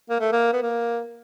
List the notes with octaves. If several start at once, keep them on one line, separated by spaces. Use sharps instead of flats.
A#3
A3
A#3
B3
A#3